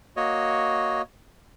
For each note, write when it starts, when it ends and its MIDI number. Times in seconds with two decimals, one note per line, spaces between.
0.16 1.02 58
0.16 1.02 66
0.16 1.02 73
0.16 1.02 75